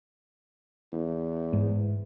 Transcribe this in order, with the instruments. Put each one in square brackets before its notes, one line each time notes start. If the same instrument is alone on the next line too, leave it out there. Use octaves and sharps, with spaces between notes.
[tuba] E2
[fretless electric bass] G#2